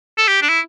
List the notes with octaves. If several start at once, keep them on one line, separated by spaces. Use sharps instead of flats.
A4
G4
D4
E4